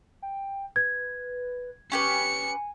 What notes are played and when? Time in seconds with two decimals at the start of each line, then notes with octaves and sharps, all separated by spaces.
0.22 G5
0.76 B4 G#6
1.92 C#4 G4 B4 G#5 C#7